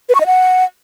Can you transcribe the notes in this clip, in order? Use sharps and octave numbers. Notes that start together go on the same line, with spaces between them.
B4
C#6
D#5
F#5